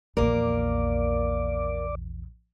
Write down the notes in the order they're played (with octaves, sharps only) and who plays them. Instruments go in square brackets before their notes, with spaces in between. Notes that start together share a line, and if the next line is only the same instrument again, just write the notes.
[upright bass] A#1 E2 [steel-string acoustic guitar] A#3 A#4 [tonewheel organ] D5